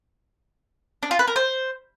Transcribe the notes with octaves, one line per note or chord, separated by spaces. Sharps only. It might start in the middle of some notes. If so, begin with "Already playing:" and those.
D4
F4
B4
A#4
C5